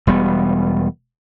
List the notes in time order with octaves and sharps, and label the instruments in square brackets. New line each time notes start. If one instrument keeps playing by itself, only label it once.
[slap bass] E1 G3 B3